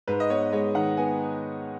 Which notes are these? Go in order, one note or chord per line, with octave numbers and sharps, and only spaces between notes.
G#2 B4
D#5
B3 C#5
G#3 C#5
D#3 F#5
B3 G#5